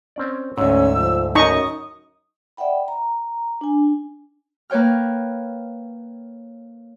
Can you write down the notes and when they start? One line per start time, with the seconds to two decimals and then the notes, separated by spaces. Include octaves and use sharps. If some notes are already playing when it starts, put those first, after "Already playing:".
0.16 C4 C#4 D5
0.58 D2 G#2 C#4 E6
0.96 F3
1.35 F#2 D#4 D#5 C#6 D#6
2.57 D5 E5 F#5 G5 B5
2.88 A#5
3.61 D4 G#5
4.70 A#3 B4 C#5 G5 F6